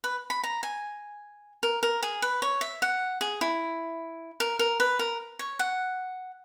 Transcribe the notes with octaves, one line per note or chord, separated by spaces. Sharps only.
B4
B5
A#5
G#5
A#4
A#4
G#4
B4
C#5
E5
F#5
G#4
E4
A#4
A#4
B4
A#4
C#5
F#5